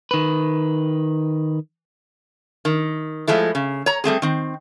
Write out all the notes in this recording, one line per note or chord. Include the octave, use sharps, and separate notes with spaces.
D#3 B4
D#3
F3 G#3 A3 E4
C#3
C#5 A#5
G3 A3 C4 G#4
D#3 C4